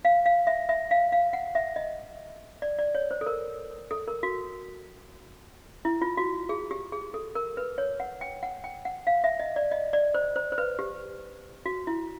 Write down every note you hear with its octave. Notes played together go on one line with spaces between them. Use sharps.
F5
F5
E5
E5
F5
F5
F#5
E5
D#5
D5
D5
C#5
C5
A4
A#4
A4
A#4
F#4
E4
F4
F#4
G#4
G4
G#4
A4
A#4
B4
C#5
F#5
G5
F#5
G5
F#5
F5
E5
D#5
D5
D#5
D5
C5
C5
C5
B4
G4
F#4
E4